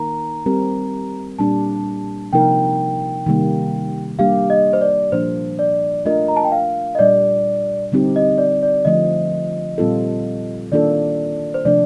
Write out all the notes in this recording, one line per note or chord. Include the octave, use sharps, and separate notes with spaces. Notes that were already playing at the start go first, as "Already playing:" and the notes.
Already playing: D#3 A#3 D#4 A#4 A#5
G3 C4 G4 A#4
A#2 G3 A#3 D4 A5
C3 F3 A#3 D#4 A#4 G5
C3 D#3 G3 A#3
G3 A#3 D4 G4 F5
D#5
C5
D5
A#2 F3 A#3 D4 C5
D5
A3 D4 F4 A#4 D#5
A#5
A5
G5
F5
D#5
A#2 G3 D4 D5
D3 G3 C4 D#4 G4
D#5
D5
D5
D3 F3 A3 D#5
A#2 G3 C4 F4 A4
D#3 A#3 D4 F4 A4 D5
C5
C3 F3 A3 D4 D5